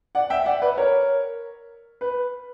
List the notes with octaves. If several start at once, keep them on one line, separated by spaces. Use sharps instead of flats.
D5 F#5
E5 G5
D5 F#5
B4 D5
A#4 C#5
B4